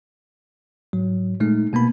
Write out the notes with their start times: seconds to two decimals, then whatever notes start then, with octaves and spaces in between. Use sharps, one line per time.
0.93 G#2 F#3
1.40 A#2 G#3 A3 D#4
1.73 B2 A#3 B3 B5